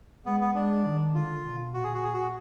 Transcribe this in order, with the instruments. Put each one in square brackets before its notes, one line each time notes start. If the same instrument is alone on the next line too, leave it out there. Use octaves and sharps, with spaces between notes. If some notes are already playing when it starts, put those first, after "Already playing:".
[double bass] G#3 [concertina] B3
[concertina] B3
[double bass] G#3 [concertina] D4
[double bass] D#3
[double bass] D3 [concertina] F4
[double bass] B2
[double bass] A#2 [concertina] F#4
[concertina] G#4
F#4
G#4
F#4